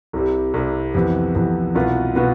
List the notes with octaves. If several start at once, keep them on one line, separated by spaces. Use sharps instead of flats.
C2 C3 G3
C2 C3 G3
F2 C3 E3 B3
F2 C3 E3 B3
C2 B2 B3 F4 B4
B2 B3 F4 B4